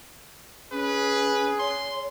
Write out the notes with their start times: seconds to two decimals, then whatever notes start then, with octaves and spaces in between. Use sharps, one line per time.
0.72 C#4 G#4 B4
1.59 C#5 C6